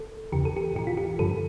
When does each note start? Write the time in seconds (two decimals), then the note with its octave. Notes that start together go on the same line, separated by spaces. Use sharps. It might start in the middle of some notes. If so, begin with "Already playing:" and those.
Already playing: A4
0.32 E2 C#3 E3 G4
0.45 A4
0.57 G4
0.75 A2 E3 G4
0.87 F4
0.97 G4
1.19 G2 D3 F3 A4